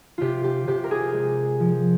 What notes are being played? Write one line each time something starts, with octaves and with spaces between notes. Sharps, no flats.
C3 F4 G4
G4
C3 G4
A#4
G#4
G#3
F3